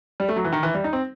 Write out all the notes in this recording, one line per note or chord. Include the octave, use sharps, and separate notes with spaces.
G3
A3
F#3
E3
D#3
E3
G3
D#4
C4